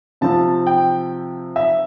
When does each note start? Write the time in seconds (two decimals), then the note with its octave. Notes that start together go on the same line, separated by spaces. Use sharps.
0.21 C3 F3 C4 A5
0.67 G5
1.56 E5